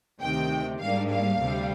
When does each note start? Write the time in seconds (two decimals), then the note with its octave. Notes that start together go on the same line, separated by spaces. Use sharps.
0.22 D2 C3 D#3 G5
0.81 G#2 G3 A#3 D4 F5
1.10 F5
1.39 D2 C3 G3